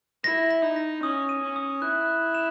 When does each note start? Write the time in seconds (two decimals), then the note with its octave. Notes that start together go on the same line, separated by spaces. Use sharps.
0.24 E4 A#6
0.51 A#6
0.63 D#4
0.76 A#6
1.03 C#4 D#6
1.29 D#7
1.42 C#4
1.56 D#6
1.81 E4 F#6
2.08 F#6
2.35 E7